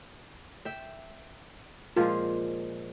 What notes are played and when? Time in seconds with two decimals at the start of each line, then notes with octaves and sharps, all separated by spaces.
0.65 E5 G5
1.96 A#2 F3 G#3 F4